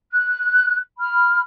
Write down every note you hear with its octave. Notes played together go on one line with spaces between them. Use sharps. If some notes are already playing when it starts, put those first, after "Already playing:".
F#6
B5 F6